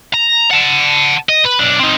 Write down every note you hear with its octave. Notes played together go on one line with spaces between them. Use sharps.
A#5
F#5 A5
D#5
B4
B1 D4
C4 D#4